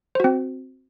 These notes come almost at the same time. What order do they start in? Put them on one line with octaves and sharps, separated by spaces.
C5 F#4 C4